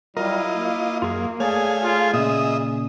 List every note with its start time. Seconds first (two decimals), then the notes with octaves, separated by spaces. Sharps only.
0.17 F#3 G3 E4 F4 A#4 D#5
0.52 A#3
1.02 F#2 F4 G#4
1.40 A3 G#4 C#5 D5 F5 G#5
1.83 F4 G#4
2.14 A#2 C#3 D#5 E5 D#6